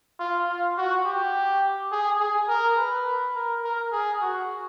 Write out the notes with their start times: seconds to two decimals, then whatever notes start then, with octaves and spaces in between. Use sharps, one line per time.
0.19 F4
0.48 F4
0.77 F#4
1.05 G4
1.91 G#4
2.19 G#4
2.48 A#4
2.77 B4
3.35 A#4
3.64 A#4
3.92 G#4
4.21 F#4